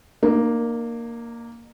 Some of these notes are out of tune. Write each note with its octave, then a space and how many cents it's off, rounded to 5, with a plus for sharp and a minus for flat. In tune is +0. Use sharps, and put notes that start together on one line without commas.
A#3 +0 D#4 -45